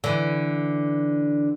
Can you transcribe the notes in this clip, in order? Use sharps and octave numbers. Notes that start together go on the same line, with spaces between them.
D3 E3